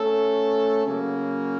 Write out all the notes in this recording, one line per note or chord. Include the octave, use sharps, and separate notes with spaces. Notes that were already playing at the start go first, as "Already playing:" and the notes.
Already playing: A3 C#4 A4
C#3 F#3 A#3